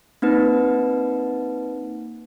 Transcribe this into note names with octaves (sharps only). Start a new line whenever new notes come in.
A#3 C4 D#4 B4